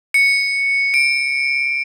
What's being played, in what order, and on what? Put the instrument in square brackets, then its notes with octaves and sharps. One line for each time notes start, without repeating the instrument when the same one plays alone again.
[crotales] C#7
D7